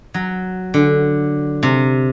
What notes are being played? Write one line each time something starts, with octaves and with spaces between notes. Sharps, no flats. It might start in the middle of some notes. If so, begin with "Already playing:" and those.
F#3
D3
C3